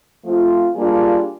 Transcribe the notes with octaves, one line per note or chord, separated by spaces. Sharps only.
F3 A3 C4 F4
G3 A#3 D4 F4 G#4